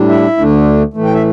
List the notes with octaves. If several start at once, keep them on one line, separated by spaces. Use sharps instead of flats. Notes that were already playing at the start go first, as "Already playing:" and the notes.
Already playing: A2 G3 D4
E4 E5
D2 D3 A3 D4
A2 E3 A3
G5
E5